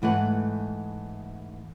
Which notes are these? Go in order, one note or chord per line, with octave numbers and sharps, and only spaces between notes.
G#2 E3 A3 F#5